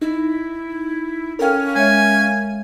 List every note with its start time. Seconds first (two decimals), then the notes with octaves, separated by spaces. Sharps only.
0.02 D#4 E4
1.39 C#4 A4 A#4 F5 G5 F6
1.75 G#3 C#5 E5 G#5